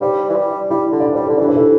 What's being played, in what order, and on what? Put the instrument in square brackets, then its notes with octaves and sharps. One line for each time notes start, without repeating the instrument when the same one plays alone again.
[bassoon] G3 [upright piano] G4 C5
[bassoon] E3
G3
[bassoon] G3 [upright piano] E4
[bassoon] D3
[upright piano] D5
[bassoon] G3 [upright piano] C5
[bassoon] D3 [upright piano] A4
[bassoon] E3 [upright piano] D4 G4
[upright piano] C5
E4 A4